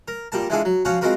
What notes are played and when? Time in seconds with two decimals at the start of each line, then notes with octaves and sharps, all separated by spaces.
0.08 A#4
0.32 A#2 G3 A#4 A5
0.50 E3 G#3 D4 F4 G#4 A4
0.65 F#3
0.85 F3 C#4 F#4 F5 C#6
1.01 G#3 C4 F4 F#4 A#4 B4